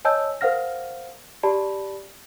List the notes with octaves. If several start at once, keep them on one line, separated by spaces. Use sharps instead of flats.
C#5 D#5 G#5 A5 E6 G6
A#4 C5 F5 F#5 F6 A#6
G4 D5 A5 B5